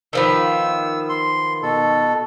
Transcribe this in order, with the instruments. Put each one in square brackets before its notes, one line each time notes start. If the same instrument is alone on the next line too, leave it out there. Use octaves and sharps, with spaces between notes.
[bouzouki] D#3 F3 B3 [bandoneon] E6
[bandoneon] C6
B2 A4